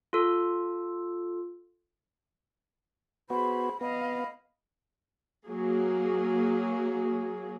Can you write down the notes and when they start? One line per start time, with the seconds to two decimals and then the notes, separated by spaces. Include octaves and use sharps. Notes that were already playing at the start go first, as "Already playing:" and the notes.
0.13 F4 A4
3.30 B3 F#4 G#4 C5 B5
3.81 B3 D#5 F5 B5
5.47 F#3 A#3 G#4